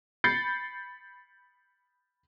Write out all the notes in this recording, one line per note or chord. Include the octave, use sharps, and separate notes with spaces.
B5 G6 A6 C7 C#7